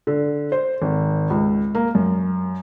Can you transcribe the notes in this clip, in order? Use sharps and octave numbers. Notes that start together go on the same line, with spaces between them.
D3
C5
G#1
C#2
A#3
F#2